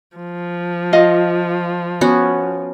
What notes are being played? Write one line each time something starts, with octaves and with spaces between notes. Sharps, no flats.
F3
F4 D#5 F5
B3 C#4 F#4